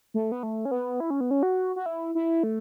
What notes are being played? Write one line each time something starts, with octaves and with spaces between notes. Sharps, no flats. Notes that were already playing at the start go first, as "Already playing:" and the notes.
A3
B3
A3
C#4
B3
E4
C#4
B3
C#4
F#4
F#4
E4
E4
A3